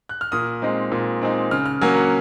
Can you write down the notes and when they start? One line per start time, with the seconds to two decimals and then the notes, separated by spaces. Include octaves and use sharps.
0.09 F#6
0.21 F6
0.32 A#2 D#6
0.62 G#3 C4 D#4
0.92 A#2
1.22 G#3 C4 D#4
1.51 C#3 F6
1.66 F6
1.81 F#3 A#3 C#4 G#5
1.96 F#5